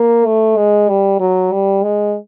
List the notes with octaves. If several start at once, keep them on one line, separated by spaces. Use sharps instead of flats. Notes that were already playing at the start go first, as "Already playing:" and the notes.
Already playing: A#3
A3
G#3
G3
F#3
G3
G#3